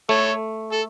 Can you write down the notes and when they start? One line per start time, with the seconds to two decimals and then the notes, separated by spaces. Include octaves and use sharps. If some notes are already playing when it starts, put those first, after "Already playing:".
0.09 A3 A4 C#5
0.72 A4